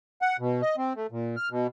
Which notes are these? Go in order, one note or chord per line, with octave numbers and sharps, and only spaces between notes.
F#5
B2
D#5
C4
A3
A#2
F6
B2